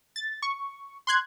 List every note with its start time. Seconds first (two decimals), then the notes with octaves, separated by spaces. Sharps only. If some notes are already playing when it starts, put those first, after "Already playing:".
0.16 A6
0.42 C#6
1.07 C6 F#6 G#6